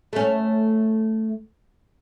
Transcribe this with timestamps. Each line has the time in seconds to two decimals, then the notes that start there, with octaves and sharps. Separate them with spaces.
0.13 A3 C#4